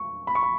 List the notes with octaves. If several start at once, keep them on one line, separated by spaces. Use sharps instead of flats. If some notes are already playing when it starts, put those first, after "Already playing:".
Already playing: C#6
B5
C#6
B5